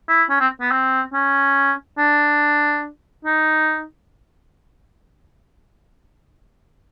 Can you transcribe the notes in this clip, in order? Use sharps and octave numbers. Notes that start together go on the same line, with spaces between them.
E4
C#4
C4
B3
C4
C#4
D4
D#4